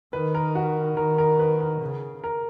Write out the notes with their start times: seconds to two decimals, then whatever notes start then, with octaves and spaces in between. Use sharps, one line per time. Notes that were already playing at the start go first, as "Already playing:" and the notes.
0.13 D#3 B4
0.35 A#4
0.55 F#4
0.97 D#3 A#4
1.18 A#4
1.39 B4
1.60 A#4
1.81 C#3
2.24 A#4